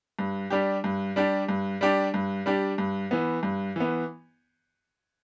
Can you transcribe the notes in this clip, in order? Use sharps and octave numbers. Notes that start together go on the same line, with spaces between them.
G2
G3 D4 G4
G2
G3 D4 G4
G2
G3 D4 G4
G2
G3 D4 G4
G2
E3 B3
G2
E3 B3